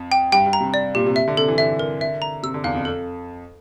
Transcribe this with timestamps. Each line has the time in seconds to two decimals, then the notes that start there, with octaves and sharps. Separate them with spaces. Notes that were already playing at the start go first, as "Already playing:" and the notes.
Already playing: F2
0.12 G5
0.32 G2 G5
0.46 G2
0.53 A#5
0.60 C3
0.74 D5
0.95 A#2 G4
1.06 C3
1.16 E5
1.28 D3
1.37 C3 A4
1.48 E3
1.58 D3 E5
1.79 A#4
2.01 E5
2.22 A#5
2.43 C3 E6
2.54 D3
2.64 E2 F5
2.75 F2
2.85 A4